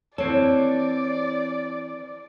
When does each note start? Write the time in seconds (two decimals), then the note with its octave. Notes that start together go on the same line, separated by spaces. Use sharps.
0.18 E3 C4 A4 C#5 D5